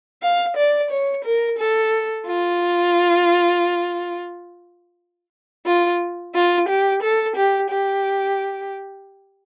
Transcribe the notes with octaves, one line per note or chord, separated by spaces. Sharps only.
F5
D5
C#5
A#4
A4
F4
F4
F4
G4
A4
G4
G4